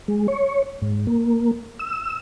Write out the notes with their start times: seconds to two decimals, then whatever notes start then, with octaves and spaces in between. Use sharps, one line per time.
0.08 G#3
0.28 C#5
0.82 G#2
1.07 A#3
1.79 E6